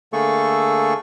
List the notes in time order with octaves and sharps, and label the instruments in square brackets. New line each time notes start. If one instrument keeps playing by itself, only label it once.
[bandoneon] D3 A3 A#3 G#4 A4 C#6